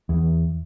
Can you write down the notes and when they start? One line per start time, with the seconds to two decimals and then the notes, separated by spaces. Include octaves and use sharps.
0.09 E2